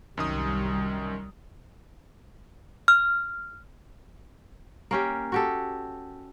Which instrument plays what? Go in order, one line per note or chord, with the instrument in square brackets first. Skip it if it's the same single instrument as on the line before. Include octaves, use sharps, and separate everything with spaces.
[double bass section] C2 G3 [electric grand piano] F#2 D#3 D#6
[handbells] F6
[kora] A#3 C#4 G4
F#4 G4 A4